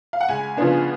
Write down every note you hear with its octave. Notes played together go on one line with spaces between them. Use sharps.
F5
F#5
C#2 G#5
C#3 F3 B3 D4